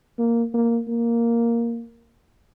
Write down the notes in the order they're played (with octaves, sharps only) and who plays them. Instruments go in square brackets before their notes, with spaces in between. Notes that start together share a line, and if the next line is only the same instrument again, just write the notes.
[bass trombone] A#3
A#3
A#3